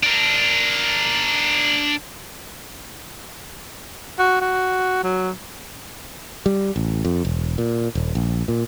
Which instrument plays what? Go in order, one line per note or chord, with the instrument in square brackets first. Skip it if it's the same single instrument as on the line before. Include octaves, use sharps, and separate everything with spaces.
[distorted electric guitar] D4 A#4
[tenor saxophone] F#4
F#4
F#3
[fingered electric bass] G3
A1
F2
E1
A#2
D#1
A#1
A#2